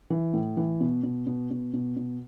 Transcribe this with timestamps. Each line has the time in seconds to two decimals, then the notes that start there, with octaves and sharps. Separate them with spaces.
0.10 E3
0.34 A2
0.57 E3
0.81 B2
1.03 B2
1.27 B2
1.51 B2
1.74 B2
1.97 B2